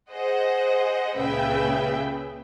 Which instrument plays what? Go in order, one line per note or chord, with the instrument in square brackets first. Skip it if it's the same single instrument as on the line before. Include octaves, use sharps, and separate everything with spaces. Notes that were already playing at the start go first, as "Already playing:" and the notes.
[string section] G#4 C5 D#5 F#5
C#2 A#2 C#3 B4 E5 G5